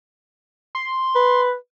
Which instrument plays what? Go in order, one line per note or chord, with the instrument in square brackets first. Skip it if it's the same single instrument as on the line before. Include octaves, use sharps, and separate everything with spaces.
[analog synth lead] C6
[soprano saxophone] B4